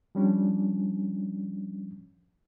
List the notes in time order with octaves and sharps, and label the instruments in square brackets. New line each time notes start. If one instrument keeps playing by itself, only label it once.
[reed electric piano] F3 G3 C#4 D4